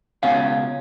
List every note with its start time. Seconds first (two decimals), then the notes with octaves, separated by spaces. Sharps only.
0.23 C#2 B2 C#4 F5